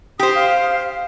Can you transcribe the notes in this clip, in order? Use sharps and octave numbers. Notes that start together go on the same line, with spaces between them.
G4 C5 D#6
F5